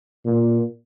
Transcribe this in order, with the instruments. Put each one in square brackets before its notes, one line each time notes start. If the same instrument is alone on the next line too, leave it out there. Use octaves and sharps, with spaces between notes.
[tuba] A#2